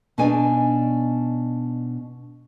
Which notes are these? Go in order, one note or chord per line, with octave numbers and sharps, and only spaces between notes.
B2 D4 D#4 D5 G#5